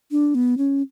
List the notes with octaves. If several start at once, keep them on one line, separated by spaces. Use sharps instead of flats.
D4
B3
C#4